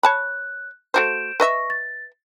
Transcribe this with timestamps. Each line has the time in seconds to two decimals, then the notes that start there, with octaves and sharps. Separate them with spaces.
0.03 C#5 A5 B5 F#6
0.94 A3 F#4 C5 G6 D7 E7
1.40 B4 D#5 E5 C#6 A#6
1.70 A6